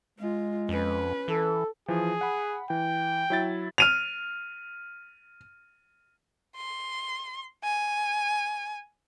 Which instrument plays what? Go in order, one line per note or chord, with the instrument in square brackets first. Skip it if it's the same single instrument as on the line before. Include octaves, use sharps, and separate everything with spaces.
[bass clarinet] G#3 [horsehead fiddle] F4
[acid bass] F2 [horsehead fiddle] C#4 B4
[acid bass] E3 [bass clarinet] A4
[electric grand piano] E3 F3 [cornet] G#4
[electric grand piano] F#5 B5
[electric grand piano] E3 [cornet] G5
[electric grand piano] F#3 E4 A6
[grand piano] F6 D#7 F7
[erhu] C6
G#5